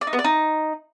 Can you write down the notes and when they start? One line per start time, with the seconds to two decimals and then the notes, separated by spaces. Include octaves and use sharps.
0.01 D5
0.07 D#4
0.13 B3
0.19 D5
0.25 D#4